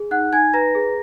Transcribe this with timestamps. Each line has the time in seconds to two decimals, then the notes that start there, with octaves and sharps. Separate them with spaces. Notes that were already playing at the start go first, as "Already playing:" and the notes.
Already playing: G#4
0.11 D#4 F#5 F#6
0.33 D#4 G#5 G#6
0.54 B4 A#5 A#6
0.75 G#4